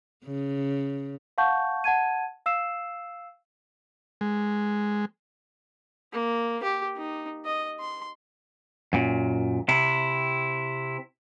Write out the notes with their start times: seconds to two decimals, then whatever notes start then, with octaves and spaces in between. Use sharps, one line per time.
0.25 C#3
1.38 F5 F#5 A5 C#6 G6
1.84 F#5 A5 G#6 D#7
2.46 F5 E6 C7 E7
4.21 G#3
6.13 A#3
6.63 G4
6.96 D#4
7.45 D#5
7.80 C6
8.93 F#2 A#2
9.69 C3 E4